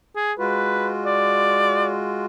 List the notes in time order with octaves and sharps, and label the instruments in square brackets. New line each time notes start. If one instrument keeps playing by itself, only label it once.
[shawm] G#4
[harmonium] G#3 F4 F#4 [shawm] B4
[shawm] D5